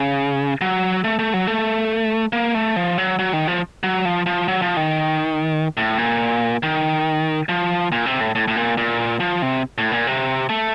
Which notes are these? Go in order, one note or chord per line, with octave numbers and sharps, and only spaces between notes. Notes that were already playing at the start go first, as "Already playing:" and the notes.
Already playing: C#3
F#3
A3
A3
F#3
A3
A#3
A3
F3
F#3
F#3
D#3
F3
F#3
F3
F3
F#3
F3
D#3
A2
A#2
D#3
F3
A#2
C3
A2
A2
A2
A#2
A#2
F3
C3
A2
A#2
C3
A3